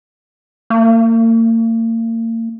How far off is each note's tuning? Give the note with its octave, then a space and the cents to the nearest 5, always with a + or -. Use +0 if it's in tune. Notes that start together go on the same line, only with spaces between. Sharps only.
A#3 -40